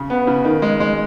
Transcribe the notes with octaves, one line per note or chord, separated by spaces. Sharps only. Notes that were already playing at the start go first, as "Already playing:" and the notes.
Already playing: C#3
B3
C#3
D#3
G#3
G#3